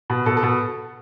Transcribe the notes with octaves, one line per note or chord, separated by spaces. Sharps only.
B2
B2 A4
A4
B2